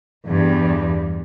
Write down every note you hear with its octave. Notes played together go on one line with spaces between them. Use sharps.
E2 G2